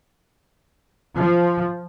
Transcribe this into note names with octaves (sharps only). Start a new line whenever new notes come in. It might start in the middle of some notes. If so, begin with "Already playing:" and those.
F3